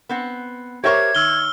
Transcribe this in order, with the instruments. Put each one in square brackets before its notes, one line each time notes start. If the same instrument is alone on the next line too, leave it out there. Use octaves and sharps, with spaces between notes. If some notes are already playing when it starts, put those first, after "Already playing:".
[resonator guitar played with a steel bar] B3 C4 F#5
[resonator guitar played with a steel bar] G4 A#4 C5 [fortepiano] C#5 E5 C#6 [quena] G#6
[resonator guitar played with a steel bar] D#3 [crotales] E6 F6 G7